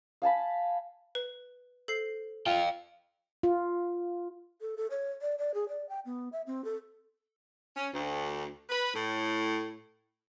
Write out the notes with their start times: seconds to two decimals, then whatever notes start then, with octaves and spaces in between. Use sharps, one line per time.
0.22 F5 G#5 A5 B5
1.15 B4
1.88 A4 C5 C7
2.46 F4 F5 G5
3.43 F4
4.61 A4
4.77 A4
4.91 C#5
5.22 D5
5.39 D5
5.54 G#4
5.69 D5
5.89 G5
6.06 B3
6.33 E5
6.47 C4
6.65 A4
7.76 C#4
7.92 D2
8.70 B4
8.93 A2